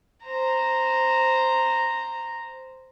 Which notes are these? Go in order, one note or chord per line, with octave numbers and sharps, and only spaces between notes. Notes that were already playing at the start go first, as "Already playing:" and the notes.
C5 A#5